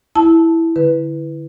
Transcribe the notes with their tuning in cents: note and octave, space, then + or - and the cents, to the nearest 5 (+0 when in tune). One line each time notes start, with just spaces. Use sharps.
E4 +0 A5 +0
D3 +10 B4 +0